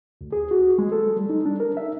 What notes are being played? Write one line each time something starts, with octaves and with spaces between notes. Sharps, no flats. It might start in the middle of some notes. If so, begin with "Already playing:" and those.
D2
G#4
F#4
G#3
A4
G3
D#4
D4
A#4
E5